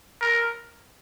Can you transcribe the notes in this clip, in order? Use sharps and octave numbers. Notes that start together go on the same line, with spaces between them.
A#4